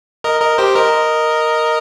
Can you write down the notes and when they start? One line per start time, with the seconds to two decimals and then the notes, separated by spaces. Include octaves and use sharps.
0.24 A#4 D#5
0.41 A#4 D#5
0.58 G4 C5
0.75 A#4 D#5